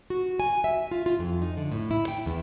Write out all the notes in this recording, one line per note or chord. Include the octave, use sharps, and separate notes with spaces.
F#4
G#5
E5
F4
F4
F2
D#4
D3
A2
E4
G5
E2